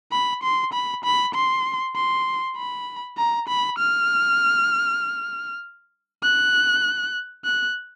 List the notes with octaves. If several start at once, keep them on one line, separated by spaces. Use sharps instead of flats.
B5
C6
B5
B5
C6
C6
B5
A#5
B5
F6
F#6
F#6